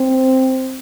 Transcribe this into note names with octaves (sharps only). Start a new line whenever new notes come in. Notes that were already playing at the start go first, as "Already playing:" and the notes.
Already playing: C4